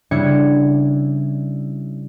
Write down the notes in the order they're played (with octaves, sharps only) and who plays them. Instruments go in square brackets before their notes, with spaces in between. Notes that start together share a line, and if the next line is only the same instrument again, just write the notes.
[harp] C#3 G3 D4 E4 G#6 C#7